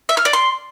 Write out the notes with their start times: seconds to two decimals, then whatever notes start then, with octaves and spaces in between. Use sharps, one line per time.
0.09 E5
0.17 F6
0.25 D5
0.33 C6